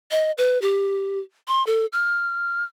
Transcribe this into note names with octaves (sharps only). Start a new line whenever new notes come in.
D#5
B4
G4
C6
A4
F6